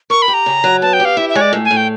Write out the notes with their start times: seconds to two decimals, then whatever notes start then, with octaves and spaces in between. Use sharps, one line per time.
0.10 A#4 C#6
0.22 B5
0.28 G4
0.34 A#5
0.46 C#3
0.64 F#3
0.82 B3 A5
0.93 G5
1.00 G4
1.05 F5
1.17 E4 E5
1.29 E5
1.35 G#3 C#5
1.41 D5
1.53 A2
1.65 G#5
1.71 A2
1.77 G5